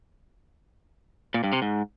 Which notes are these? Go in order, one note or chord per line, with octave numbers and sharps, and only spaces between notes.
A#2
G2
C3
G#2